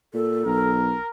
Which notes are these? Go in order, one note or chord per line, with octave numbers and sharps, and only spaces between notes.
A#2 A4
B1 A#4